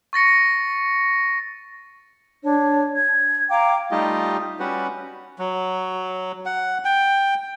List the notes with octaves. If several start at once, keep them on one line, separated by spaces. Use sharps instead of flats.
C#6 A6 A#6 C#7
D4 C#5
G#6
F5 G5 A#5 D6
G3 A3 D#4 F4 G4 D#5
G3 C#4 F#4 G4 B4 F#5
F#3
F#5
G5